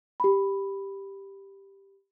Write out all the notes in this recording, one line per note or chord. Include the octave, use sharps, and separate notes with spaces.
G4 B5